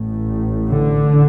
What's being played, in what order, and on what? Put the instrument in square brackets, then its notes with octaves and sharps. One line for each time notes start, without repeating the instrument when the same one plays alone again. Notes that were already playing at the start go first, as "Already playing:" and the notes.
Already playing: [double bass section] A1 A2
D3